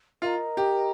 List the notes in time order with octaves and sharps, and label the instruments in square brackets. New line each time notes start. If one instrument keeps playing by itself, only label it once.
[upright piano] F4 [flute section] A#4 D#5 A#5
[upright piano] G4